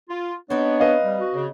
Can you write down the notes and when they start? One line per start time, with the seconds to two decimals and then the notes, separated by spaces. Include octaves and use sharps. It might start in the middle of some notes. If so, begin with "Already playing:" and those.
0.10 F4
0.50 B3 C4 D4 D#4 C#5
0.80 B4 D#5 F5
1.04 G3
1.20 F#4
1.35 C#3